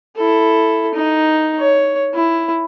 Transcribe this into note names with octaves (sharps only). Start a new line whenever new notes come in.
E4 A4
D#4
C#5
E4